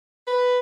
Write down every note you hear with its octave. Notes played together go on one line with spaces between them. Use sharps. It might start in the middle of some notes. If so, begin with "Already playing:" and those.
B4